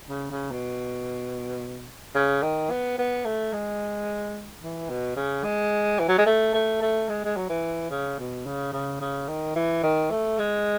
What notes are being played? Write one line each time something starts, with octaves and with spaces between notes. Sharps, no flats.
C#3
C#3
B2
C#3
D#3
B3
B3
A3
G#3
E3
B2
C#3
G#3
E3
F#3
G#3
A3
A3
A3
G#3
G#3
F#3
E3
C#3
B2
C#3
C#3
C#3
D#3
E3
D#3
A3
G#3